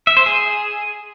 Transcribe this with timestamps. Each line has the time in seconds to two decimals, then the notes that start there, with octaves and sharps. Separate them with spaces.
0.07 E5
0.17 C5
0.26 G#4